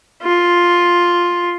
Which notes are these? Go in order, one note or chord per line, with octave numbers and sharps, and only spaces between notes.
F4